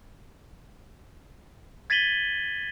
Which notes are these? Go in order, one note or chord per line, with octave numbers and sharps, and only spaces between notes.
G#6 A6 B6 D#7 F#7 G7